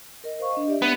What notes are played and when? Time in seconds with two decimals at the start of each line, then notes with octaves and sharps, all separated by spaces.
0.24 A#4 D#5
0.40 C5 F5 C#6
0.52 D4 D#5
0.68 G4 D5 E5
0.82 B3